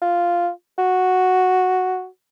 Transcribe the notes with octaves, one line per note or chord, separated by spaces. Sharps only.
F4
F#4